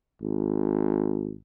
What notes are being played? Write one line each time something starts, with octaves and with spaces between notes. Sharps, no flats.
G#1